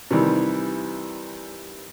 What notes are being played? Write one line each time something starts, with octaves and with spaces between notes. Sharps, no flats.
C3 D#3 E3 G3